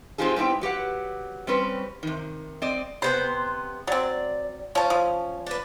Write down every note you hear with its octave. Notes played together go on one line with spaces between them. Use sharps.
C3 C4 D#4 F4 G4 G#4
G#2 B3 C4 E4 G5
F#3 G4 B4 F#5
G3 C4 C#4 B4
C3 D#3
C4 D5 D#5
C3 B3 C5 G5
F#3 C4 D5
F3 C#4 A5
F3
D4 B4